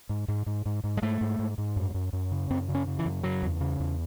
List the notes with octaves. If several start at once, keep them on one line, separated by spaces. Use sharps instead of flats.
G#2
G#2
G#2
G#2
G#2
G#3
G#2 A3
G#2
G#2
G#2
F#2
F#2
F#2
C#3
F#2 C4
C#3
C#4
C#3
E3
F#2
C#3 F#3
E2
C#3
E2